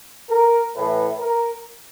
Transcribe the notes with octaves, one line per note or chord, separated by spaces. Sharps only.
A#4
A2 E3 A3 B4
A#4